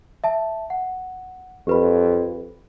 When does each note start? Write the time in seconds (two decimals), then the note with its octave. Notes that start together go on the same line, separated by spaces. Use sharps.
0.24 E5 A5
0.70 F#5
1.67 F2 G4 B4 B5